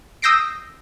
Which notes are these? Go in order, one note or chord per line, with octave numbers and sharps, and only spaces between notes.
D#6 E6 G6 A#6 C7 D7